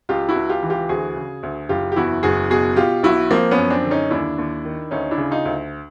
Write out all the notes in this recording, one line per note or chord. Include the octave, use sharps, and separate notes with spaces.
C#2 F4 G4
E4 F#4
C#2
F4 G4
E3
F4 G4
D2 F#4 G#4
C#3
D2
F#1 F4 G4
G4
E2 E4 F#4
F#1 F#4 G#4
B2 F#4 G#4
B2 F4 G4
B1 E4 F#4
F3 A#3 C4
B3 C#4
F#2
C4 D4
D3
C#4 D#4
D#2 D4 E4
D#2
D#3
D2 C#4 D#4
D4 E4
C#3
D#4 F4
D2